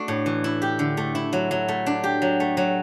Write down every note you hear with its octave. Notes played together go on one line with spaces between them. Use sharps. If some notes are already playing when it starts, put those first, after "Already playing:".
Already playing: A3 D4 F#4
A2
E3
E4
G4
D3
A3
E4
F#3
F#3
A3
D4
G4
F#3
A3
F#3